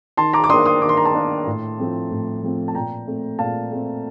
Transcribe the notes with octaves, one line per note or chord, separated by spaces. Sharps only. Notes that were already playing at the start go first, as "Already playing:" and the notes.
D#3 A5 C6
A#5 D6
D6
A#3 D4 C6 D#6
C6 D#6
D#3 D6
C6
A#5
A5 C6
A#3 D4
A2
F3 A3 C4
A2
F3 A3 C4
A5
A#2 G5 A#5
A3 C4
A#2 F5 A5
A3 C4